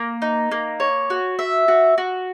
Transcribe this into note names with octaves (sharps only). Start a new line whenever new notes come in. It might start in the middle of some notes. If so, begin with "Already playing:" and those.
Already playing: A#3
D#4
A#3
C#5
F#4
E5
F#4
F#4